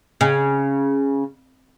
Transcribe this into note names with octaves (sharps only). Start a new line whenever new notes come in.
C#3